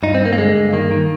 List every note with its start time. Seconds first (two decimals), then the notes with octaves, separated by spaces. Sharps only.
0.03 G2 D#4
0.15 C4
0.21 G2 A#3
0.33 A#3
0.37 D3 G#3
0.55 G2
0.73 D#3 A#3
0.91 D#3